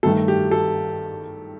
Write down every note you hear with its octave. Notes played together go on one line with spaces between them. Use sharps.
G2 D#3 A3 A4
G4
A4